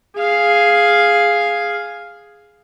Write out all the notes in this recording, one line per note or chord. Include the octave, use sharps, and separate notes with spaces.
G#4 F5